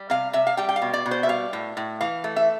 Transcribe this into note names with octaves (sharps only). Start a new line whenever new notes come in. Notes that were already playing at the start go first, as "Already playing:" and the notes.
Already playing: G3
C3 F5
C3 E5
F5
G3 G5
G5
F5
B2
D5
B2
C5
E5
G3 F5
A2
A2
E3 F5
A3
E5